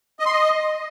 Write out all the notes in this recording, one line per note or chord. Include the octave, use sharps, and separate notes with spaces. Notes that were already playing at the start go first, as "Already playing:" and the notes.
D#5
C6
D#5